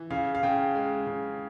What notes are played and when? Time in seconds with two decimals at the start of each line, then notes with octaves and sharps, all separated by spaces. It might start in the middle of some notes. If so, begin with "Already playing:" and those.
Already playing: E3
0.11 C#3 F5
0.35 F5
0.43 C#3 G5
0.75 G#3
1.07 C#3